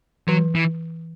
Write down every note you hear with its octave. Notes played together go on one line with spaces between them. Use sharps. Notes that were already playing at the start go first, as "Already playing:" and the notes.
E3 F#3
E3